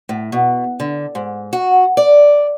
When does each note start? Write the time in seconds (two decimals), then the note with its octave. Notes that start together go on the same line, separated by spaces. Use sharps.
0.09 A2
0.32 B2
0.80 D3
1.15 G#2
1.53 F#4
1.97 D5